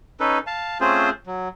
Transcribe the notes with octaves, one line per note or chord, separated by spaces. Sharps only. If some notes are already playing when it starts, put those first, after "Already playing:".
C#4 D#4 A4 B4
F5 A5
A3 C4 C#4 F4 G#4 C5
F#3